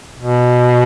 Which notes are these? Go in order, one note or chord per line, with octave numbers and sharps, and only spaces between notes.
B2